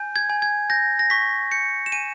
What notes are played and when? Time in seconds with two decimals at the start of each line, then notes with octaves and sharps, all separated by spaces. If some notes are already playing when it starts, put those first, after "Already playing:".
Already playing: G#5 G6
0.16 G#6
0.30 G#5
0.42 G#6
0.70 G6 A#6
0.99 A#6
1.10 C#6 B6
1.51 G6 C#7
1.86 E7
1.92 G#5 D#7